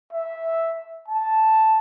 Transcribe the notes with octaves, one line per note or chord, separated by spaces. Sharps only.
E5
A5